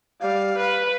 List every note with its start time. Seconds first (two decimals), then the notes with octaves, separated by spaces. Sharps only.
0.21 G3 F5
0.58 B4